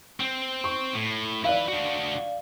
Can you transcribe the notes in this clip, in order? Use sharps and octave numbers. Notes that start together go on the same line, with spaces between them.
C4
C#6
A2
E4 B4 D5 F5
D4 F#4